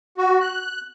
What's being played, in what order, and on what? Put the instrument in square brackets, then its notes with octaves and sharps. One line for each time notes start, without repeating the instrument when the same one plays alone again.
[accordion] F#4
F#6